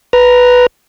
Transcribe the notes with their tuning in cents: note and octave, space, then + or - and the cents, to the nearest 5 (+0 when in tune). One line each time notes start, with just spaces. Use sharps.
B4 +0 A#5 +0